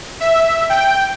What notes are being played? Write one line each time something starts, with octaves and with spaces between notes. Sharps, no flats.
E5
G5